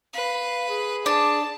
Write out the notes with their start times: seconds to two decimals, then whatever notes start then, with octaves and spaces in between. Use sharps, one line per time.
0.13 B4 F5
0.69 G#4
1.06 D4 A5